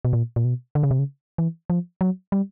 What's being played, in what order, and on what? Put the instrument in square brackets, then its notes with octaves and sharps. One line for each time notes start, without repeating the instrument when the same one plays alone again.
[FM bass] B2
A#2
A#2
B2
D3
C#3
C3
C#3
E3
F3
F#3
G3